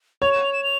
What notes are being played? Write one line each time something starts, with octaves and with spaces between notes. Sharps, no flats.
C#5 F7
E7
F7
E7
F7